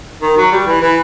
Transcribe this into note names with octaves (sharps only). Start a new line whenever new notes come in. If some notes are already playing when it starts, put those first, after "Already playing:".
D#3
F#3
G3
E3
E3